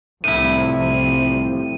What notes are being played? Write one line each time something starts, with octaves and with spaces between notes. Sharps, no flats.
C2 A2 C3 F3 E4 D#7